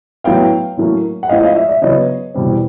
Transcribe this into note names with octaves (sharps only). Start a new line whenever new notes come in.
A2 F#3 B3 F5 G5
A2 F#3 A#3 C#4
F#5
A2 F3 G#3 D#5 F5
D#5 F5
D5 E5
D5 E5
C#3 F#3 B3 C#5 D#5
E2 B2 G3 C4